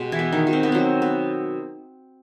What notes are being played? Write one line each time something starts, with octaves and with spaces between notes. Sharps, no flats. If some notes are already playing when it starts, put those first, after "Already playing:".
Already playing: B2 G#3 G4
E3 E4
B3
D#3 D#4
B2
C4
B3
F#3 C4
B3